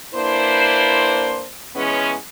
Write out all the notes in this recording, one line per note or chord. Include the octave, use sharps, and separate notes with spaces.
A#3 D4 E4 B4 C5
E3 G#3 B3 C#4